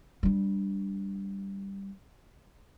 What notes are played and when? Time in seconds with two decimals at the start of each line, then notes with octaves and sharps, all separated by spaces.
0.23 G3 D4